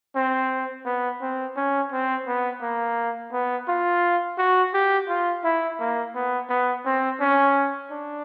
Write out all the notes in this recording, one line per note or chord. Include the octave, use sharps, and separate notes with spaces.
C4
B3
C4
C#4
C4
B3
A#3
B3
F4
F#4
G4
F4
E4
A#3
B3
B3
C4
C#4
D4